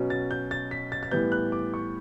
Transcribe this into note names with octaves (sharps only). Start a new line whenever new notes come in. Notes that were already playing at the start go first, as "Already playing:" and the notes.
Already playing: B2 F#3 C#4
A6
G6
A6
B6
A6
A6
A2 E3 G3 B3 G6
F#6
D6
C#6